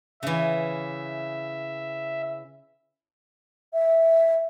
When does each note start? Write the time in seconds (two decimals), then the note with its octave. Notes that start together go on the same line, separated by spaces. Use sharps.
0.23 C#3 E3 E5
3.74 E5